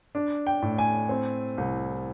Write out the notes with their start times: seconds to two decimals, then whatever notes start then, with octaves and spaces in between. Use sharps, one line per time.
0.15 D4
0.47 G5
0.62 A2
0.78 G#5
1.09 C4
1.58 C2